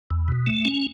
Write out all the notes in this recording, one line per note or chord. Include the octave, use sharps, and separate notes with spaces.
E2
B2
A3
C#4